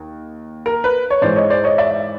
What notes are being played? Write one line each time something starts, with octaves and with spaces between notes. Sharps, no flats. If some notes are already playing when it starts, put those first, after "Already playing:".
Already playing: D#2
A#4
B4
C#5
G#2 E3 G#3 C5 D5
C#5 D#5
C5 D5
C#5 D#5
D5 E5